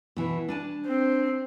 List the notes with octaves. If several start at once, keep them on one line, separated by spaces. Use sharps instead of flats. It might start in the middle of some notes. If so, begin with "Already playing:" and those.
B2 E3
D4 G#5 A5
C4